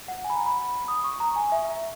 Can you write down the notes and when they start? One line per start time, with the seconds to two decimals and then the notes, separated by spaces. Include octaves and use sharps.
0.08 F#5
0.24 G#5
0.30 B5
0.35 A#5
0.46 B5
0.88 D#6
1.04 C#6
1.20 A#5
1.36 G#5
1.52 E5